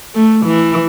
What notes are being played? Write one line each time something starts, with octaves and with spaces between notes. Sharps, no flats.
A3
E3